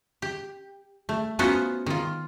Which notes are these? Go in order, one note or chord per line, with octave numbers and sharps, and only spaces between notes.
G4
A3
B3 C#4 D#4 F4 F#4 C5
D#3 F4